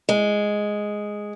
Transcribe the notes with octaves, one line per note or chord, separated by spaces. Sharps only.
G#3